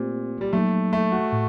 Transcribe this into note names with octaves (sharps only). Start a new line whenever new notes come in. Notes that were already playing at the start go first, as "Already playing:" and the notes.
Already playing: A#2 A3 C4 G4 C5
G3
F#3 A3 A#3 D#4
A3
F#4
A2